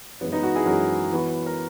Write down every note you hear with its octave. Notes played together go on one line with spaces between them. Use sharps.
F#2 E3 G#3 B3
B3 D#4
D#4 F#4
E4 G#4
F#2 E3 G#3 F#4 A#4
E3 B3 F#4
A#4